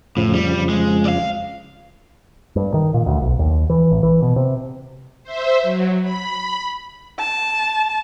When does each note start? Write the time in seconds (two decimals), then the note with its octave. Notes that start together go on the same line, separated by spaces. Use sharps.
0.17 F2 A2 C#3 F3
0.34 G3
0.69 G#3
1.05 D5 F5
2.56 G2
2.74 D#3
2.94 A#2
3.06 D2
3.22 B1
3.39 D#2
3.70 E3
3.91 A1
4.03 E3
4.22 B2
4.36 C3
5.24 C5 E5
5.63 F#3
6.02 B5
7.19 A5